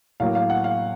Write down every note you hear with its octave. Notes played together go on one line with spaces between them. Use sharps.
A2 F#3 A#3 F5
F5
F#5
F5